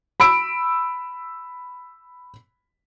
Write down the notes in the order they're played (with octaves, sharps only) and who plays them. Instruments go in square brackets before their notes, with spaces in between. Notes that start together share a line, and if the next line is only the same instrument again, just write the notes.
[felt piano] B5 E6 D7